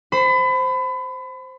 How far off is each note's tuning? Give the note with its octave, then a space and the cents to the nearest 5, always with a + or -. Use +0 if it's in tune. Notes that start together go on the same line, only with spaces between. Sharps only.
C5 +0 B5 +30